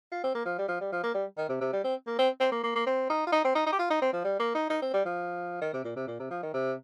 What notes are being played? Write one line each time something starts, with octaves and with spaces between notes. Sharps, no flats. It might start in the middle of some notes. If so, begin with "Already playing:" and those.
F4
C4
A#3
F3
G3
F3
G3
F3
A#3
G3
D#3
C3
C3
G3
C4
A#3
C4
C4
A#3
A#3
A#3
C4
D#4
F4
D#4
C4
D#4
D#4
G4
F4
D#4
C4
F3
G3
A#3
D#4
D#4
C4
G3
F3
D#3
C3
A#2
C3
A#2
C3
F3
D#3
C3